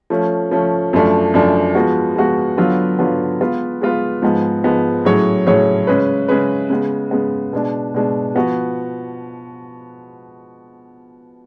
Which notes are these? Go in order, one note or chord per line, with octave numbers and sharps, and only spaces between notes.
F3 A3 C#4
F3 A3 C#4
F#2 F3 A3 D4
F#2 F3 A3 D4
F3 G#3 B3 F#4
F3 G#3 B3 F#4
D3 F#3 B3 F4 B4
D3 F#3 B3 F4 B4
G#3 B3 F4 B4
G#3 B3 F4 B4
G#2 F3 G#3 B3
G#2 F3 G#3 B3
A2 F#3 C#4 G#4 C#5
A2 F#3 C#4 G#4 C#5
C#3 G#3 C#4 G#4 B4
C#3 G#3 C#4 G#4 B4
C#3 G#3 B3
C#3 G#3 B3
B2 G#3 D4
B2 G#3 D4
F3 B3 F#4